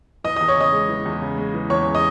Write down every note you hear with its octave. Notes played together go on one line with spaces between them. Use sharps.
E3 D#5 D#6
D#5 D#6
E2
C#5 C#6
C#3 D#5 D#6
G#3
E3
E2
C#3
G#3
E3
E2 C#5 C#6
C#3
D#5 D#6